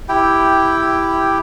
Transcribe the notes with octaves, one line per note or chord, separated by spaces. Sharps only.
E4 G4 G5